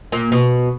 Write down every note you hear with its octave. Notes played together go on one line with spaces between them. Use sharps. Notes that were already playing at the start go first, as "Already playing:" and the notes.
A#2
B2